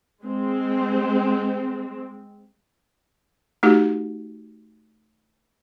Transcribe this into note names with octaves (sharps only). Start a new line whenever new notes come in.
G#3 C4
A3 D#4 F#4 G4